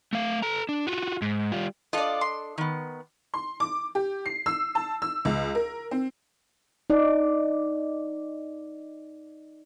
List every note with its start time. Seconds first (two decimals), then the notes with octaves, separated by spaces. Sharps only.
0.13 A3 F5
0.42 A4 A#5
0.69 D4
0.87 F4 F#4
1.22 G#2
1.52 G3 F4
1.93 D4 F4 A4 D5 D#5
2.21 C6
2.58 D#3 B3
3.34 C6
3.60 D6
3.95 G4
4.26 C7
4.46 E6
4.75 A5
5.02 E6
5.25 C#2
5.55 A#4
5.91 C4
6.90 D#4 D5